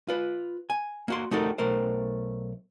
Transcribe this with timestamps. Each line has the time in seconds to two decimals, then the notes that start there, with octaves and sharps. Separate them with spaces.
0.08 F4 B4
0.70 G#5
1.08 A#3 F#4 C6
1.31 A3 D#4 F#4 G4 A4 A#4
1.58 B1 A3 A#4 C5